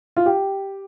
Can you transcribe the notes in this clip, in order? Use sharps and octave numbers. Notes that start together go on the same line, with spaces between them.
F4
G4